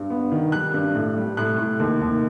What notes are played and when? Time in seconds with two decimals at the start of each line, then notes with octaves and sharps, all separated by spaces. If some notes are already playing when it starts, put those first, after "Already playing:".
Already playing: G2
0.10 B3
0.32 D#3
0.52 G3 F#6
0.74 G2
0.95 A2
1.16 G3
1.37 A2 F#6
1.58 A2
1.80 D#2
2.01 D#2